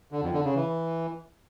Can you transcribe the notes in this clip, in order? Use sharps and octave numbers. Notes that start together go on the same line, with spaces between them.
D3
F2
D3
C#3
E3